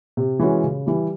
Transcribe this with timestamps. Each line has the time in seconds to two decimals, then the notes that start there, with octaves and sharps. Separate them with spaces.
0.17 C3
0.39 E3 G#3 C#4 F#4
0.64 C#3
0.86 E3 G3